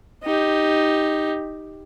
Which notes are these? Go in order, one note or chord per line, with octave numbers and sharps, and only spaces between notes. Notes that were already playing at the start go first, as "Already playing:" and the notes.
D#4 G4